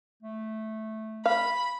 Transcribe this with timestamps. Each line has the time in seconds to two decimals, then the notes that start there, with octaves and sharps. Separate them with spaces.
0.22 A3
1.26 F5 B5